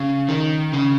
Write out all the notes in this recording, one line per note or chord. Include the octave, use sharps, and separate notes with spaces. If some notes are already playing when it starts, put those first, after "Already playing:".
Already playing: C#3
D#3
C#3